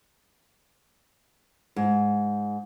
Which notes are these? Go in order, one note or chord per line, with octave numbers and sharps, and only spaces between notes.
G#2